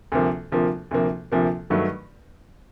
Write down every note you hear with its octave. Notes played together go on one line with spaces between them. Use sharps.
D2 C3 F3 A#3
D2 C3 F3 A#3
D2 C3 F3 A#3
D2 C3 F3 A#3
G2 D#3 F#3 A3